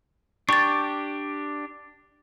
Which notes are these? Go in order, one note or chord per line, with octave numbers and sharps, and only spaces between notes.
D4 G4 C#6 A6